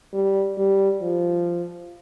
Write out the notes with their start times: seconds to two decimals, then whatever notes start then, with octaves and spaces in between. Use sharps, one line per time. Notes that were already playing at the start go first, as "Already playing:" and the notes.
0.13 G3
0.58 G3
1.02 F3